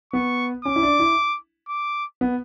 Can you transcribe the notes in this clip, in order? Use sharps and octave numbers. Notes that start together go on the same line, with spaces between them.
B3 C#6
C#4 D6
E4
D4
E4
D6
B3